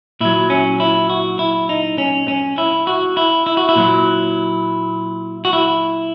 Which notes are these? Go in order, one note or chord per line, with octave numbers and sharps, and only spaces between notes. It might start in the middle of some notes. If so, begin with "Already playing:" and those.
A#2 F#3 E4
C#4
E4
F#4
E4
D#4
C#4
C#4
E4
F#4
E4
E4
F#4
E4
A#2 F#3
F#4
E4